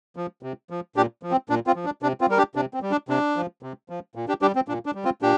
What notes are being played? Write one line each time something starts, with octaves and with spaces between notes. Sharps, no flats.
F3
C3
F3
A#2 D4 G4
F3
C4
A#2 D4
C4 F4
F3
D4
C3 D4
C4 F4
G3 A#4
D4 G4
C3 D4
C4
G3
D4
C3 D4
F3
C3
F3
A#2
D4 G4
G3 D4 G4
C4
A#2 D4
D4
G3
C4 F4
A#2 D4 G4